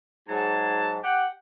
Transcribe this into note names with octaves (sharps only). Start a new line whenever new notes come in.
G#2 F#3 A5
G4 F#5 G5